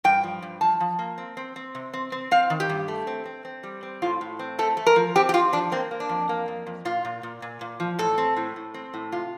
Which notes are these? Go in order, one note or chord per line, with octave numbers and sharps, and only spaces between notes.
G2 G5
F3
G2
F3 A5
F3
A#3
C4
C4
C4
C3
C4
C4
C4 F5
D#3
G4
G2
A3
C4
C4
C4
G3
C4
A2 F4
A2
C4
A3 A4
A3
A#4
F3
C4 G4
G4
C4 F4
F3 D4
A#3 C4
A#3
D4
F2
A#3
F2
F2
A#2 F4
A#2
A#2
A#2
A#2
F3
A2 A4
C4
A2
A2
C4
A2
C3 F4